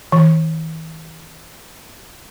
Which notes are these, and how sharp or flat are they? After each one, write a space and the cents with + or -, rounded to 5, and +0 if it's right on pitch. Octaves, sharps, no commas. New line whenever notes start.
E3 -45